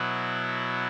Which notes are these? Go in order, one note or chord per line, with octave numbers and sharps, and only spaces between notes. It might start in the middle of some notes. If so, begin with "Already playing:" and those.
Already playing: B2 F#3 B3 E4